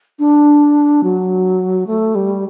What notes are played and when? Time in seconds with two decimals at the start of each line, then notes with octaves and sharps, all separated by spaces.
0.19 D4
1.03 F#3
1.87 A3
2.15 G3